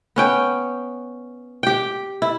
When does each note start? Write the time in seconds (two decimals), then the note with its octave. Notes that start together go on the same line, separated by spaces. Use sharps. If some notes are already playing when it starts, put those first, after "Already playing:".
0.16 B3 C#4 G5
1.63 G4 G5
2.22 E4